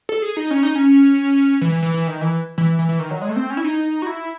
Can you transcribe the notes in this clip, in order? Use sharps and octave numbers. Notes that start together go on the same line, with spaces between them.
A4
G#4
D#4
C#4
D#4
C#4
E3
E3
E3
E3
D#3
E3
E3
E3
E3
D#3
F#3
G#3
A3
C4
C#4
E4
D#4
F#4
E4